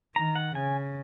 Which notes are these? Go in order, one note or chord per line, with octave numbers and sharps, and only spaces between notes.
D#3 A#5
F#5
C#3 G#5